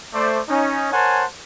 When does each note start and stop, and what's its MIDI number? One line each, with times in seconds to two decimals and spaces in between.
0.14 0.40 57
0.14 0.40 72
0.14 0.40 74
0.48 0.92 61
0.48 0.92 63
0.92 1.24 70
0.92 1.24 72
0.92 1.24 73
0.92 1.24 78
0.92 1.24 80
0.92 1.24 81